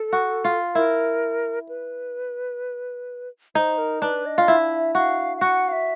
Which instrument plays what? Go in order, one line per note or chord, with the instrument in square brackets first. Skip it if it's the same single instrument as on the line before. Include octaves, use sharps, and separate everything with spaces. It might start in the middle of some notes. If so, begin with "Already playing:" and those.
Already playing: [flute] A4
[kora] F#4
F4
[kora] E4 [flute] A#4
[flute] B4
[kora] D#4 [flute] C5
[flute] A#4
[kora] D4 [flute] B4
[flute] D#5
[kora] F4
[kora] E4 [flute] E5
[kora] F#4 [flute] F5
[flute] F5
[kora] F#4 [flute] F#5
[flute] F5
E5